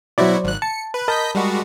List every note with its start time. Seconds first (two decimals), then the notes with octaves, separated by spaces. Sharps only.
0.18 B2 F#3 E4 F#4 C5 D5
0.44 G#1 F#6
0.62 A5 C#7
0.94 B4
1.08 A#4 D#5 A5 B5 G6 B6
1.35 G3 G#3 F#4